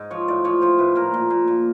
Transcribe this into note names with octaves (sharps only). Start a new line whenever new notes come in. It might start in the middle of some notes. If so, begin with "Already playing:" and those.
Already playing: G#2 D#5
F3 C#5
A2 D5
F3 C#5
F3 C5
A2 B4
A#2 A#4
A#2
A#2
A#2